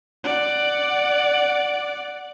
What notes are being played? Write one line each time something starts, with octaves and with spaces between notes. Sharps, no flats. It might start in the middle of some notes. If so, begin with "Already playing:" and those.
D5 F#5